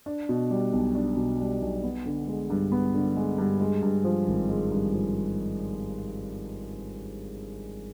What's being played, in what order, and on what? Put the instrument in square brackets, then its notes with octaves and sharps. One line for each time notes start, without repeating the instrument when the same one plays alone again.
[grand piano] D4
B2
G3
B1
D4
B2
G3
B1
B3
D3
G#3
G2
B3
D3
G#3
G2
G#3
G2
F3
G#1
G#3
G2
F3